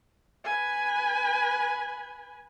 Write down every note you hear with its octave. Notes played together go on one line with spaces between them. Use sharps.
B4 G#5